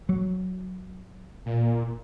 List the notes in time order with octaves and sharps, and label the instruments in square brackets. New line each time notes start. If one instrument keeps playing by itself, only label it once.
[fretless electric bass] F#3
[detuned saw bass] A#2